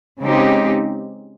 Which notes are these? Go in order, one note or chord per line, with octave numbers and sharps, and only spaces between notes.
C#3 G#3 C4 D#4 G4